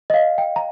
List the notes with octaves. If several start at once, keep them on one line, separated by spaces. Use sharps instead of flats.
D#5
F5
G5
A#5